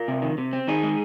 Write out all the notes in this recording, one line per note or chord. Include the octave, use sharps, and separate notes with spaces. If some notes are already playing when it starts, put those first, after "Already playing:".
Already playing: F4 A#4
C3
D#3
C3
C4
D#3 D#4 G#4
G#3